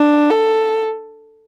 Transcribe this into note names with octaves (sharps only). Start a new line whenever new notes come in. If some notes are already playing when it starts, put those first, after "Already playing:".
Already playing: D4
A4